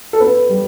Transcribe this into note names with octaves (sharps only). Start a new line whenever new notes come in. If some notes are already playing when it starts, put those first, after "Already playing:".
A4
B3 B4
G3